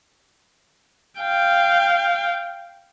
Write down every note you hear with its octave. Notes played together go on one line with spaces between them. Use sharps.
F5 G5